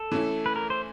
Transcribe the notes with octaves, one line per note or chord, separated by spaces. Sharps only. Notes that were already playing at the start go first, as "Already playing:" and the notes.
Already playing: A4
E3 A3 C#4 E4
B4
A#4
C5